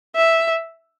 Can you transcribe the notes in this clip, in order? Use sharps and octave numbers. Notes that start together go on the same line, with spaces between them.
E5